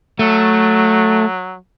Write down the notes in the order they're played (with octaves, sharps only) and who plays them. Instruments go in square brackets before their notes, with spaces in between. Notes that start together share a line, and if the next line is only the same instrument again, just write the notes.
[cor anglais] F#3 [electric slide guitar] A3